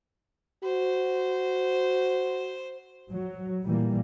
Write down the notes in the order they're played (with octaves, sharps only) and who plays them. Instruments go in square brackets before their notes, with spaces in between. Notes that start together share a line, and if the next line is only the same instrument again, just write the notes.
[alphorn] F#4 [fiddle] C5
[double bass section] F#3
A#2 E3 G3 A#3